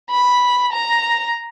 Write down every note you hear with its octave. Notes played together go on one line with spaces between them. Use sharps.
B5
A#5